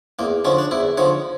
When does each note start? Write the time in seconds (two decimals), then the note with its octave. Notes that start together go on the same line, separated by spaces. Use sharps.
0.19 E2 A#3
0.45 D3 F3 C#4
0.58 D4
0.71 E2 E4
0.97 D3 F3 C#5